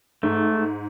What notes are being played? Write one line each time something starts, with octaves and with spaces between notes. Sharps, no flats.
G#2 A3